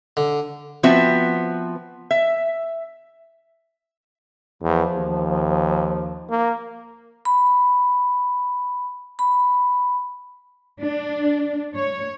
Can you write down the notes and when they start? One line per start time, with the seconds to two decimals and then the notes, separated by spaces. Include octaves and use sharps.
0.17 D3
0.83 F3 B3 C4 F#4 E5
2.11 E5
4.63 E2 F3
4.95 D#2
6.30 A#3
7.25 B5
9.19 B5
10.82 D4
11.76 C#5